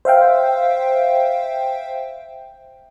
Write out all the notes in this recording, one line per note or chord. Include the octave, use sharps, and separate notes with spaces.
C5 E5 F5 G5